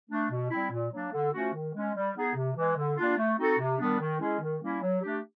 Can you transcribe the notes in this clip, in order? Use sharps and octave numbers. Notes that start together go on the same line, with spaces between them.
A3 D4
B2
G3 C4 E4
A#2
F#3 A#3 D4
D3
F3 A3 C#4 F#4
D#3
G#3 C#4
G3
B3 D#4 G#4
C3
E3 G#3
D3
G3 A#3 D4 F4
A3
C4 D#4 F#4 A4
C3
D#3 G3 B3 D4
D#3
G#3 C#4 E4 G#4
D#3
G3 A#3 C#4 E4
F#3
A3 D4 G4